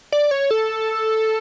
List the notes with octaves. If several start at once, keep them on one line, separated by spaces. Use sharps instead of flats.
D5
C#5
A4